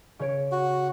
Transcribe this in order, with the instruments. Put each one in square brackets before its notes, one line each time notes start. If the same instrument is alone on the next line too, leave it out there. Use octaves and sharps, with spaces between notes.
[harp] C#3 C#5 D7
[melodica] F#4